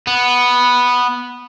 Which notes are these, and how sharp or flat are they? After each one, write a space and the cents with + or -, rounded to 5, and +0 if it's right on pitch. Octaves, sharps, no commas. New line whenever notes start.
B3 -5